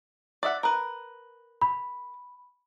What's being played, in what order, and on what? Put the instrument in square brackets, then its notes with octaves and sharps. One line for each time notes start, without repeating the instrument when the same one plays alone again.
[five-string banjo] D5 E5 F#5
A#4 B4
[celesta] B5